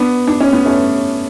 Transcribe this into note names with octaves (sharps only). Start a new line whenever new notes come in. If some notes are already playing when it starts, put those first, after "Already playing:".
Already playing: B3 D4
D4
C#4
B3
A3 C#4